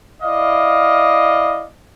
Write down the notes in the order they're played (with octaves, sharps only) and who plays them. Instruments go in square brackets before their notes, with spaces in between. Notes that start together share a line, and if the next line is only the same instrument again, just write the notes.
[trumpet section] E4 D5 D#5 F5